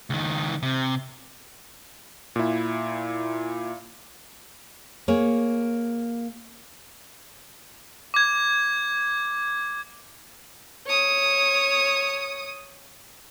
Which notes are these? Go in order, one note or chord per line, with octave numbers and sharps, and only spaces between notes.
C#2 D#3
C3
A#2 E4
A#3 G#4 C#5
D6 G#6
C#5 D#6